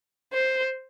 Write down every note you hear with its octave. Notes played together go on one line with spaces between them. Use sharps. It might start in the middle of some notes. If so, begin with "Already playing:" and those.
C5